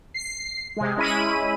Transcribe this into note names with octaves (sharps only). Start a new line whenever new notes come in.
C7
C3 G#3
G#3 C#4 E4 B5 D#7